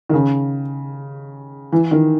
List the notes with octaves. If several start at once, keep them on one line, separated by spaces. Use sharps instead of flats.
D#3
C#3
E3
D#3